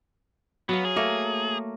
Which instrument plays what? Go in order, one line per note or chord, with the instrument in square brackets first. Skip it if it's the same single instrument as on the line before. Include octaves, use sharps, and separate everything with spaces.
[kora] F#3 F5 [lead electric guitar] B3
[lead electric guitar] G#4
[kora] A3 A#3 A#4